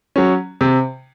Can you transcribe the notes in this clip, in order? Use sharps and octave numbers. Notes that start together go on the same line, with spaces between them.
F#3 C#4
C3